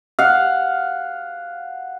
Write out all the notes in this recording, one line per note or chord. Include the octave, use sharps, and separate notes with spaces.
F5 F#5